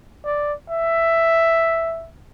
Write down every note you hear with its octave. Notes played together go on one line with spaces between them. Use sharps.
D5
E5